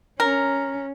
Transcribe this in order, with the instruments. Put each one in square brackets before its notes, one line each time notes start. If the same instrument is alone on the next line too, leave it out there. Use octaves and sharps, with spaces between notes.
[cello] C#4 [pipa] A#4